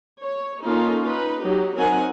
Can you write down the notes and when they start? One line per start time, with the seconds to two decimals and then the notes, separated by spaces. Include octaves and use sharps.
0.23 C#5
0.64 A#3 C#4 D#4 F4 A4
1.08 D#4 B4
1.42 F#3 D#4 G4
1.76 F#3 C4 D#4 A#4 F#5 G#5